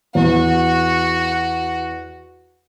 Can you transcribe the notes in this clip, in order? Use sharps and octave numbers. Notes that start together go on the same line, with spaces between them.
E2 F#4